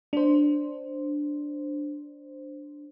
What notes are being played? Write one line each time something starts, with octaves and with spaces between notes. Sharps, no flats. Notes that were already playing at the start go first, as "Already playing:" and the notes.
D4 C5